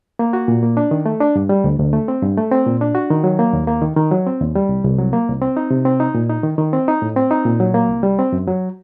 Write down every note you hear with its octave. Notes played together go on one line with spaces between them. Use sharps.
A#3
F#4
A#2
A#3
D4
D#3
A3
D4
G2
G3
D2
D2
A3
C4
G2
A3
C4
A#2
D4
F#4
D#3
F#3
A#3
D#2
A#3
D#3
D#3
F#3
C4
D#2
G3
C2
C2
F#3
A#3
C2
C4
D#4
C3
C4
D#4
A#2
D#4
D#3
D#3
C4
D#4
A2
C4
D#4
A#2
F#3
A#3
C2
G3
C4
F#2
F#3